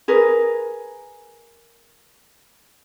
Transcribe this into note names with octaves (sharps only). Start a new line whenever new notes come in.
G#4 A#4 B4